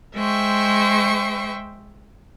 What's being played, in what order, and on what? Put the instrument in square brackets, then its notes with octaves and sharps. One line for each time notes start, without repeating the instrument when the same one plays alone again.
[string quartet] G#3 C5 E5 G5 C#6